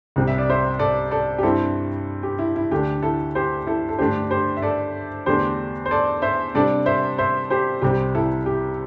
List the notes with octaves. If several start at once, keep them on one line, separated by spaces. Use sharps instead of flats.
C2 C3 G3
E5
D5
C5 E5
A4 D5
A4 D5
G4
G2 G3 C4 E4 A4
G4
E4
E4
D2 D3 A3 D4 G4
E4 A4
G4 C5
E4 A4
A4
G2 D3 A3 D4 G4 C5
G4 C5
E5
A4 D5
E2 D3 A3 D4 G4 C5
C5
A4 D5
C5 E5
C3 G3 D4 A4 D5
C5 E5
C5 E5
G4 C5
C2 C3 G3 C4 G4
E4 A4
G4